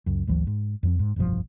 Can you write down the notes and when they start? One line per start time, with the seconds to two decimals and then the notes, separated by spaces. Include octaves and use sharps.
0.06 C#2 F#2
0.27 G#1 D2 E3 F#3
0.47 G#2
0.83 F2 F3 C4
0.99 G#2
1.16 F1 B1 G2 F3